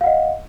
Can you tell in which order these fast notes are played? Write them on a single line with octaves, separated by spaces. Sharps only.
F5 F#5 D#5